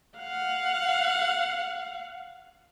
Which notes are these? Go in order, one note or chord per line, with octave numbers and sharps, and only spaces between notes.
F5 F#5